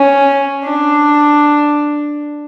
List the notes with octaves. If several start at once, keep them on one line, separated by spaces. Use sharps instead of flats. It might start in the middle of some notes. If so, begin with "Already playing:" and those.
Already playing: C#4
D4